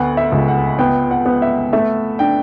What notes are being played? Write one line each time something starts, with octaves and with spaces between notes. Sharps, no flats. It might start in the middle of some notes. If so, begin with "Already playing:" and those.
Already playing: D2 B3 F#5
E5
C#2
F#5
B3 G5
F#5
B3
E5
A3 E5
D4 G5